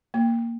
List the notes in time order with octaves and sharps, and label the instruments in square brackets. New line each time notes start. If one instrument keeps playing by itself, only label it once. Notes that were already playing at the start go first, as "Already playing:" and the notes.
[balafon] A#3